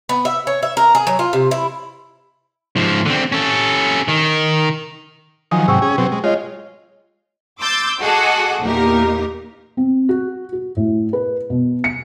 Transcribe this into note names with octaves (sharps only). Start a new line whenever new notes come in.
B3
E5
C#5
E5
A#4
G#4
F#3
F4
C3
E4
G#2 F3
D3 C4
C#4 A4
D#3
D#3 F3 F#3 G#5 D#6
G#2 C3 F#3 G5 C#6 E6
C#4 G#4
B2 F#3 C4
G#3
G#3 F4 C#5 D#5
C6 D6 E6 G6 A6
F#4 G#4 A4 D#5 F#5 D6
E2 A#2 A#3 D#4 G4 A#4
C4
F#4
F#4
A2
B4
B2
C#7